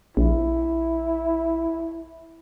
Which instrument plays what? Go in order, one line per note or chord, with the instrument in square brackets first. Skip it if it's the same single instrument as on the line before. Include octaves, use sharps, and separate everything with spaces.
[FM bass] A#1 [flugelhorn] E4